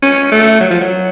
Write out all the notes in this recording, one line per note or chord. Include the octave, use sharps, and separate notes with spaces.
C#4
A3
F#3
F3
F#3